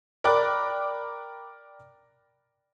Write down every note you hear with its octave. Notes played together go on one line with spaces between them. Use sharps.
A#4 D5 G5 B5 D6 F#6